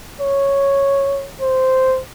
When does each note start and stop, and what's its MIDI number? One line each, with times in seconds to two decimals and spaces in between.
0.21 1.28 73
1.41 2.00 72